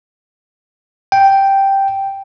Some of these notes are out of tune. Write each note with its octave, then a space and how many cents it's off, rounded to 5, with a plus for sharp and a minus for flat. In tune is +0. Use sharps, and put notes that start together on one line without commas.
G5 +0